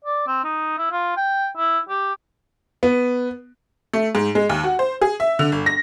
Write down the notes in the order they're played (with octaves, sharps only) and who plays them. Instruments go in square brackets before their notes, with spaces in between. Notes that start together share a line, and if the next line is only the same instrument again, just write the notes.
[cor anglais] D5
C4
D#4
E4
F4
G5
E4
G4
[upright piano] B3
[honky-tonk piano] A3
G#2
G#3
D#2
F#4
C5
G#4
E5
D3
G1
A#6